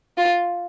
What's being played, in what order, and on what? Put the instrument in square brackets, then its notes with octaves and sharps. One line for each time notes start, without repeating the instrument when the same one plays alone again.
[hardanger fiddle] F4